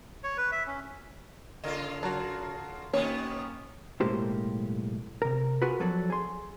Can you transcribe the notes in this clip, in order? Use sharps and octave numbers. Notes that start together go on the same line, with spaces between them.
C#5
B4
E5
C#4
C#3 F4 A#4 D#5
F#3 F#4 A#4 A5
B2 D#3 A#3 B3 C#4 C#5
B1 A2 G#3 A#3 G4 C5
C3 A#4
F4 F#4 G#4 A#4 B4
F3 F#3 F#4 A4 D5
G#4 C6